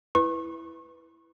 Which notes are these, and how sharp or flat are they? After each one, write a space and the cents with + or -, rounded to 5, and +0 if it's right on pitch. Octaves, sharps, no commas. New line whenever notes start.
E4 +0 B4 +5 C#6 -35